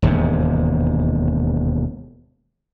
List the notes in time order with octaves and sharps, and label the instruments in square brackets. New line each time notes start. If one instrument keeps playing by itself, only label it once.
[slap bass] E1 D#2 G#2 C3